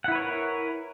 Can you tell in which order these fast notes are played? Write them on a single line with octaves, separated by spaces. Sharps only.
F#5 E4 B4 C#5 A#4